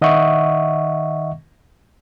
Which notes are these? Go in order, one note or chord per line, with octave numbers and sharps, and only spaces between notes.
D#3 D#5 E5 F#5 C#6